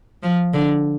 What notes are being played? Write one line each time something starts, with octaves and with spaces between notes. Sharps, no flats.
F3
D3